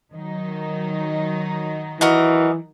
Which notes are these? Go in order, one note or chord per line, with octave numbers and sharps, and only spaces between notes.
D#3 F#3 D#4
E3 F#4 A#4 D#5